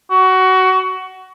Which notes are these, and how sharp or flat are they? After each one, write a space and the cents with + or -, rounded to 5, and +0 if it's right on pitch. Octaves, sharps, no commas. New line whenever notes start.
F#4 +20